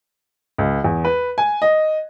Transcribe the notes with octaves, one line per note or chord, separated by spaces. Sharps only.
C#2
E2
B4
G#5
D#5